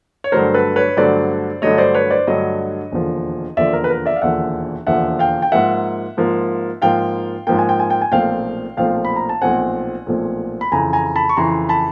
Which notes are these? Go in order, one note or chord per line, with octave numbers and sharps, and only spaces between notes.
C#5
G2 D3 F#3 A3 A#4 C5
A4 B4
B4 C#5
G2 D3 F#3 A3 C5 D5
G2 D3 F#3 A3 C#5 D#5
C5 D5
B4 C#5
C5 D5
G2 D3 F#3 A3 C#5 D#5
E1 D#2 D3 F3
E1 D#2 D3 F3 D5 E5
A#4
B4
A#4
D5 E5
F5
E1 D#2 D3 F3 E5 F#5
E1 D#2 D3 F3 E5 F#5
F5 G5
G5
G#2 F3 A#3 E5 F#5
G#2 F3 A#3
G#2 F3 A#3 F5 G5
G#2 F3 A#3 G5
G#5
G5
G#5
G5
G#5
B1 A#2 F3 A3 C4 F5 G5
B1 A#2 F3 A3 C4 F5 G5
B5
A#5
A5
B1 A#2 F3 A3 C4 F#5 G#5
B1 A#2 F3 A3 C4
B5
F2 C#3 E3 G#5 A#5
G#5 A#5
A5 B5
C#6
F2 C#3 E3 A#5 C6
A5 B5